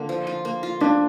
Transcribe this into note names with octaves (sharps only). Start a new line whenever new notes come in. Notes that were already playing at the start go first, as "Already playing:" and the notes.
Already playing: D3 A#3 F4
F3
F4
A#3
F4
A#3 D4